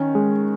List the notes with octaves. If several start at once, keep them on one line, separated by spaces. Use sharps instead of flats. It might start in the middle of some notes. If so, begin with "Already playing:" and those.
Already playing: D#3 C#4
G#3